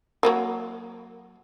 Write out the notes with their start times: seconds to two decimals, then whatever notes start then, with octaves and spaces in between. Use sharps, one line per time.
0.23 F#3 G3 A#3